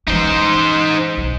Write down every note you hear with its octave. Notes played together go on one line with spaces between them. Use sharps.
E3 C#4 D#4 C5
B1